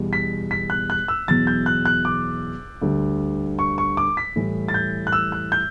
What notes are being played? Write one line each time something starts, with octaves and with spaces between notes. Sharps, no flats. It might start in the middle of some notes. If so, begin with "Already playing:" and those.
Already playing: E2 B2 G3
B6
B6
F#6
F#6
E6
E2 B2 F#3 A6
G6
F#6
F#6
D6
D2 D3 G3
C#6
C#6
D6
B6
A2 E3 G3
A6
G6
F#6
E6
F#6
G6